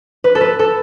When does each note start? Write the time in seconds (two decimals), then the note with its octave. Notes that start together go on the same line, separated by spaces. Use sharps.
0.24 B4
0.35 A4
0.41 B4
0.59 A4